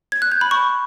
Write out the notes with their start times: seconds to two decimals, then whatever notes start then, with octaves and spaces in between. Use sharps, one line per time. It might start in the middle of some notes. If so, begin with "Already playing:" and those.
0.12 G#6
0.22 F#6
0.32 G6
0.41 B5
0.51 C#6